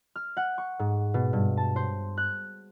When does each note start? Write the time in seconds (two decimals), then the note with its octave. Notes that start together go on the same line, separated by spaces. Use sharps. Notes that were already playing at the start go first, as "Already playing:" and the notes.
0.16 F6
0.37 F#5
0.58 C#6
0.79 G#2
1.14 B2
1.33 G2
1.57 A5
1.76 C5
2.17 F#6